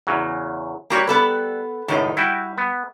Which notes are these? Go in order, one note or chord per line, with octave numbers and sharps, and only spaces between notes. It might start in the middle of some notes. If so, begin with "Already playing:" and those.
E2 C#3 F#3
G3 A#3 F#4 G4 C#5 A#5
B3 A4 B4
C#2 F#2 A2 D#3 D#4
G3 E4 F#4 G5
B3